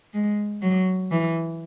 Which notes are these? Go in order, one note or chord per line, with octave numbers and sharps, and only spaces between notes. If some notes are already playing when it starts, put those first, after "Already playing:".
G#3
F#3
E3